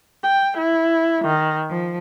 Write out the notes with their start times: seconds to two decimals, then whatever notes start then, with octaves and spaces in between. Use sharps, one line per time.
0.22 G5
0.57 E4
1.25 D#3
1.68 F3